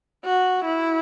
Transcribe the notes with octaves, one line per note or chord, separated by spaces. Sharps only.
F#4
E4